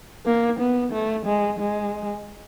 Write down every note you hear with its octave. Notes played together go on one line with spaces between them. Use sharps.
A#3
B3
A3
G#3
G#3